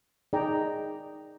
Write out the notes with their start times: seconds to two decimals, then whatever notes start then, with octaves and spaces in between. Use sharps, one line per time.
0.33 D#4 G#4 D5 G5 A#5